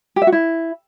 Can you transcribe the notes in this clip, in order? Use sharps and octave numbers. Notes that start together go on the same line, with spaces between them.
G4
E5
F#4
E4